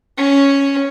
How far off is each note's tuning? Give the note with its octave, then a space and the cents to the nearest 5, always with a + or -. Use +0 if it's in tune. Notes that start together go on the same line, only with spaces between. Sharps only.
C#4 +0